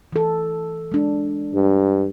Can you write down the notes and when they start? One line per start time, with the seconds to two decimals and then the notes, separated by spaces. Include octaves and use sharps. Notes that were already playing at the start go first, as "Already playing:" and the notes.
0.13 E3 A4
0.92 G#3 D4
1.55 G2